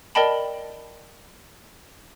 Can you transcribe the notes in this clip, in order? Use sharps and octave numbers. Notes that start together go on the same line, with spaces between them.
A#4 D5 D#5 G5 A5 B5